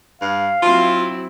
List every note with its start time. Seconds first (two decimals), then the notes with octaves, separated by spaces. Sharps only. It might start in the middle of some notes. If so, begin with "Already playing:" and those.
0.22 G2 F5
0.63 F#3 C4 E4 F4